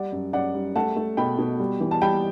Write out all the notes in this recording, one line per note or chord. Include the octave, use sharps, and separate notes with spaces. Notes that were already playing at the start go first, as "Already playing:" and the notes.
Already playing: G3 D5 F#5
F#2
F#2 D5 F#5
G3
A3 F#5 A5
A3
B2 G5 B5
B2
G3
E3
A5
G3 G5 B5